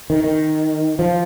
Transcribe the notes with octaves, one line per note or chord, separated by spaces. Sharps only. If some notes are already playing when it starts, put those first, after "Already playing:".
D#3
D#3
F3